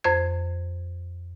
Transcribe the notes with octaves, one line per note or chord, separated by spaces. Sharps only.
F2 C5 G#6